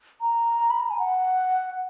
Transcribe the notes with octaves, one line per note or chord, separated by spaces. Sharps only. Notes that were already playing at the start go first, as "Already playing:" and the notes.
A#5
B5
A#5
G#5
F#5